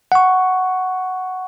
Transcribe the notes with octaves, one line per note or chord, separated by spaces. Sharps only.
F#5 C#6